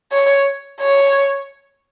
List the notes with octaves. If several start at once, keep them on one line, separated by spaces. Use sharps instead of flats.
C#5
C#5